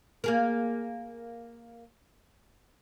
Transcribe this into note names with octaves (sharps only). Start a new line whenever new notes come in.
A#3 G#4 A#4